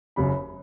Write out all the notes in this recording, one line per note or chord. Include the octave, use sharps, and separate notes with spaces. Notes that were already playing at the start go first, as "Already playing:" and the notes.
F#1 F#2 C#3 B5